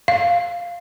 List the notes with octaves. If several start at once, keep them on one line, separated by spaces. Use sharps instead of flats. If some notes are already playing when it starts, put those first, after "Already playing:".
F5